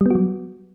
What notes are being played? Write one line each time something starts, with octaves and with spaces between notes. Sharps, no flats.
F#3 G3 B3 F#4